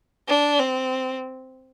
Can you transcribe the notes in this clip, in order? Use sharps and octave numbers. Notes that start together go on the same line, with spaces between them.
D4
C4